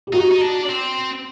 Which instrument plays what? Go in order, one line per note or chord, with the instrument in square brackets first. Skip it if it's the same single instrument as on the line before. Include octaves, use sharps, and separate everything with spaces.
[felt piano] G4
[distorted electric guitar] D#4 [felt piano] F#4
[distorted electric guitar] D#4
D4
C4